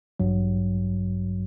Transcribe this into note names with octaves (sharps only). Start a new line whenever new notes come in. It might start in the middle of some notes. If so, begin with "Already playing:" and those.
A1 G2 F#3